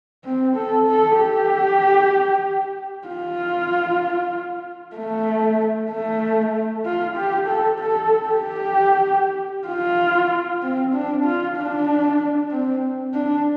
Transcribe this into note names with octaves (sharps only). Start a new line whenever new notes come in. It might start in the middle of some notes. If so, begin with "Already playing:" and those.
C4
A4
A4
G4
F4
A3
A3
F4
G4
A4
A4
G4
F4
C4
D4
F4
D4
C4
D4